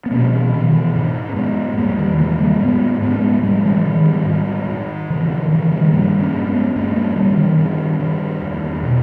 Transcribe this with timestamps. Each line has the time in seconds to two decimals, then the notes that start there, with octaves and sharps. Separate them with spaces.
0.06 B3
0.11 B2 A#3 C#4
0.28 G3
0.33 E3
0.53 B2 D#3
0.73 E3
0.95 G#2
1.29 C#4
1.36 G#2 G#3 B3
1.73 B3
1.77 E2 G3 A#3
1.98 D#3 G3
2.19 C#3 E3 G#3
2.40 G3 A#3
2.60 G#2 G#3 B3
3.01 G#2 B3
3.11 C#4
3.20 G#3 B3
3.43 G#2 G3 A#3
3.60 G3
3.64 E3 G#3
3.85 G#2 D#3
4.05 D#3 G3
4.26 G#2
4.68 G#2
5.10 C#3 E3
5.30 D#3
5.50 C#3 E3
5.71 D#3 G3
5.84 G#3
5.92 G2 G3 A#3
6.20 A#3 C#4
6.33 G2
6.47 G#3 B3
6.75 G2 A#3 C#4
6.95 G3 A#3
7.11 G#3
7.16 G2 D#3 G3
7.37 D#3
7.58 G2 D#3
7.99 G2 D#3
8.41 E2
8.83 B2